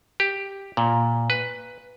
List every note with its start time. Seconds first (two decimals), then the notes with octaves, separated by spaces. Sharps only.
0.20 G4
0.77 A#2
1.30 B4